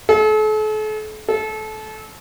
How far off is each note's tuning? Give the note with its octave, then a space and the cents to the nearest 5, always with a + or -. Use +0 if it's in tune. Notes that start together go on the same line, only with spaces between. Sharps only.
A4 -40
A4 -25